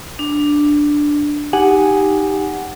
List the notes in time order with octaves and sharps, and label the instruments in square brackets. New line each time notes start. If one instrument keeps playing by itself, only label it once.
[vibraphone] D4
[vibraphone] D#4 [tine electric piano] G4 F#5 G#5